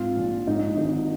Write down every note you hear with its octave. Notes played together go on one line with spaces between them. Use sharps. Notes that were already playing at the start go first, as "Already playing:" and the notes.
Already playing: G#2 C4 F4
A#1
G#2 D#4
G#1 D#4